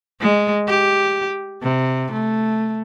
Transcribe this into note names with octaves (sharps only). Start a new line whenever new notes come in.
G#3
G4
C3
A3